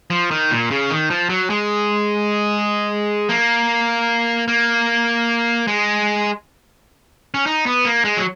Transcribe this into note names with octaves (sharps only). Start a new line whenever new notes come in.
F3
D#3
A#2
C#3
D#3
F3
F#3
G#3
A#3
A#3
G#3
C#4
D#4
B3
A#3
G#3
F#3